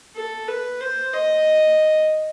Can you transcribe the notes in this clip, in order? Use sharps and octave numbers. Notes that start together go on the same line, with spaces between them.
A4
B4
C5
D#5